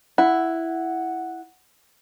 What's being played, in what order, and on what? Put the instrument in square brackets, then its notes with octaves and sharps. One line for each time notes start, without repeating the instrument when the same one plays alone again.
[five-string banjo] E4 [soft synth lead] F#5